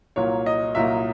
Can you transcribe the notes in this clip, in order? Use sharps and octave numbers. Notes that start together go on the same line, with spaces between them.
C2 A#2 F#3 A#3 C#5
D#5
C2 A#2 F#3 A#3 E5